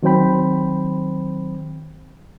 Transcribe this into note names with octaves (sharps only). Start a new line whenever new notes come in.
D#3 F#3 C4 C5 G5 B5